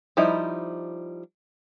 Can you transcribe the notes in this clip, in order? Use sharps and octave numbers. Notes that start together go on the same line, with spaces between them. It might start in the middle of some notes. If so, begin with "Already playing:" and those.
F3 G3 D#4 E4